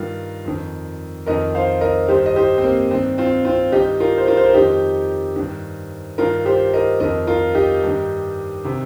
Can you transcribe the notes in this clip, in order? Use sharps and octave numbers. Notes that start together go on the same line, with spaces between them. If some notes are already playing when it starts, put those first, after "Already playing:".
Already playing: G2 D#3 F4 A#4
F2 D#3
F2 D#3 A#4 D#5
C5 F5
A#4 D#5
G2 D#3 G4 C5
D#5
G4 C5
C4
A#3
G2 D#3 C4
C4 F4
C4 F4
G2 D#3 D#4 G4
F4 A#4
C5
F4 A#4
C5
A#4
F2 D#3 D#4 G4
G2 D#3
G2 D#3 F4 A#4
G4 C5
A#4 D#5
F2 D#3 A#4 D#5
F4 A#4
D#4 G4
G2 D#3
C3 D#3